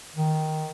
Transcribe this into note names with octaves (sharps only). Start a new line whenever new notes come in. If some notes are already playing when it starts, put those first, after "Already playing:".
D#3